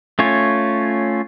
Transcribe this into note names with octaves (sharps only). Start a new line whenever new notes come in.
A3 C#4 F4 C#5